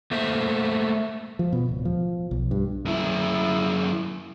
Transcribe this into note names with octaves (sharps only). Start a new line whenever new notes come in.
A3 A#3 C5 E5
F3
B2
D1
F3
B1
G2
F#2 E4